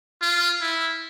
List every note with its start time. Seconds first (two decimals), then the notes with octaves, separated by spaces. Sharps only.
0.22 F4
0.61 E4